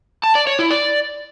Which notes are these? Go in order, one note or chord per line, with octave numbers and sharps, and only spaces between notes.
A5
D5
C#5
E4
D5